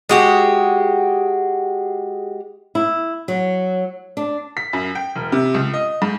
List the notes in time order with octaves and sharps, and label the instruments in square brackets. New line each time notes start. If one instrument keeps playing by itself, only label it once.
[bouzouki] G#3 F#4 G4
[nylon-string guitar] E4
F#3
D4
[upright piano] B6
F#2
G5
E1
C3
C#2
D#5
G#2